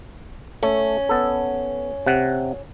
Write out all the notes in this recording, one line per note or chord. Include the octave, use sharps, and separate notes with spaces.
A3 C#4
B3 A4
C3 F#5